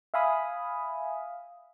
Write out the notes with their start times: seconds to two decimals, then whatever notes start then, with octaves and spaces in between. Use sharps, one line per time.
0.14 E5 F5 G#5 B5 D#6